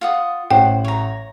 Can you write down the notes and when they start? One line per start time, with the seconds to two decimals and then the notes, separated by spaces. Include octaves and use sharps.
0.01 F4 F#5 D#6
0.51 A1 C5 F#5 G5
0.85 C#5 A#5